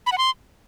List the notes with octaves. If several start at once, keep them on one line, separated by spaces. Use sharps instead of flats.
B5
F#5
C6